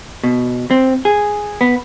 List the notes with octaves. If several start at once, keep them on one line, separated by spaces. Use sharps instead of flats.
B2
C4
G#4
B3